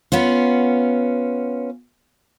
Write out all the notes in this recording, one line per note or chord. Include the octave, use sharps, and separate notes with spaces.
B3 C#4 F4